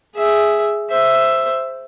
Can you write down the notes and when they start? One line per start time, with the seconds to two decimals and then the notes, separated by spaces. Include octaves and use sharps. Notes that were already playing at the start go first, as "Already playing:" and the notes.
0.15 G#4 E5
0.90 C5 E5